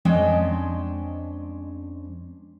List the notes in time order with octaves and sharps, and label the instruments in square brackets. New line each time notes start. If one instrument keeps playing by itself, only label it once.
[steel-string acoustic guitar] F2 G#3 C#4 D4 D#5 G5